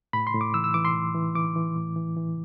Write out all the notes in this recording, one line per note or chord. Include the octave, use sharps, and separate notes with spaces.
A2 B5
C6
A2
D6
E3 E6
E6
E3 D6
C6
A2
E3
E3 D6
E3
A2
E3
E3